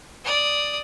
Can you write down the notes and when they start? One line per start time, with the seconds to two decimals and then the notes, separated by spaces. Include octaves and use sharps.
0.24 D5 D#6